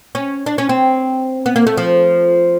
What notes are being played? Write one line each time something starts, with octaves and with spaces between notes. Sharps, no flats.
C#4
D4
C#4
C4
B3
A#3
A3
F3